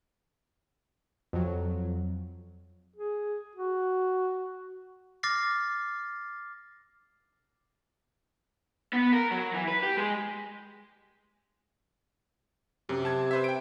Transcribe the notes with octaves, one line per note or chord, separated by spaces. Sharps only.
F2 F#3
G#4
F#4
D6 F6 A6 A#6 C7
B3
A#4
F#3
E3
B4
G4
G#3
F#2 C3
A5 G#6
B4 C5 E5
G5 D7